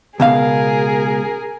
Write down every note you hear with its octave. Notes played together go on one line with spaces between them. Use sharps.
C#2 B2 G#4 A#4 F5